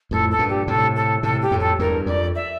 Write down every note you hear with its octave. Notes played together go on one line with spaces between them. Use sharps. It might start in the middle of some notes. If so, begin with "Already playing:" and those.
F2 A2 A4
A4
G2 A#2
G4
A2 C3 A4
A4
A2 C3 A4
G4
F2 A2
A4
E2 G2 A#4
F2 D5
E5